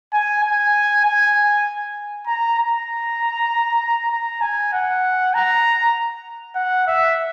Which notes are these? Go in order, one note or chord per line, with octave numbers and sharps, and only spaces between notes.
G#5
G#5
G#5
A#5
A#5
A#5
G#5
F#5
A#5
F#5
E5